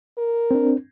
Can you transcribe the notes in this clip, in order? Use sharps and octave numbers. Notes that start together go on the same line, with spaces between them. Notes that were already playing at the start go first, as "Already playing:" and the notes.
A#4
C4 D4